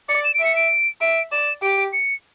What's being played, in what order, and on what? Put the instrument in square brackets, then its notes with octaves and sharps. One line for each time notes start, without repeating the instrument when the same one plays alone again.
[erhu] D5 [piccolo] C#7
[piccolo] E7
D7
[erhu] E5
[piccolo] C#7
D7
[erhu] E5 [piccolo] D7
[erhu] D5 [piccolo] E7
[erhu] G4 [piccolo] D7
[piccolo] C#7